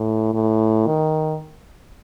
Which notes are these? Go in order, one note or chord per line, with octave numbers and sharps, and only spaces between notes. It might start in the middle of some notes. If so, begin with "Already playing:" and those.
Already playing: A2
A2
D#3